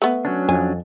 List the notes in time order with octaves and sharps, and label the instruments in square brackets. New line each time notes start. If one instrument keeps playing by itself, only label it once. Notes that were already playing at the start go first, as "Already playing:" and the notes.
[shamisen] A3 B3
[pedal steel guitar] F#3 C#4 D4
[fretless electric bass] F2 [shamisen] G#5